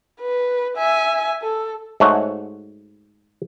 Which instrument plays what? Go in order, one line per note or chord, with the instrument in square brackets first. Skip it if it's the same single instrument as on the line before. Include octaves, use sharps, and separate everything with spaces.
[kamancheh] B4
E5 G#5
A4
[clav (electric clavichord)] G#2 A3 F#4 C#5